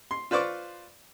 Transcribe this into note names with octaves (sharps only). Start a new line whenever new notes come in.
C6
F4 B4 C5 D5 C#6 D6